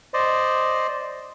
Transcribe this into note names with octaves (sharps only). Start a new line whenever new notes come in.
C5 D5 D#5